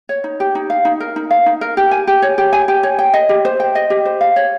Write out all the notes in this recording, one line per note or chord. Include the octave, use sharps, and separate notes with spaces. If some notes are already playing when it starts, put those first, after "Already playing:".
C#5
D#4
G4
D#4
F5
D#4
A#4
D#4
F5
D#4
A#4
G4
G#5
G4
C#5
G4
G#5
G4
C#5
G5
D#5
G4
C5
G5
D#5
G4
C5
F5
C#5